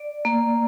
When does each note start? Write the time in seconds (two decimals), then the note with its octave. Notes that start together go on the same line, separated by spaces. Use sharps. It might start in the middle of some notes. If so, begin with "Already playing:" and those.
Already playing: D5
0.25 A#3